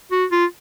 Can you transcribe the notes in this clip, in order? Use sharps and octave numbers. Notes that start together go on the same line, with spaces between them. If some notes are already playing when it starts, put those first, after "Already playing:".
F#4
F4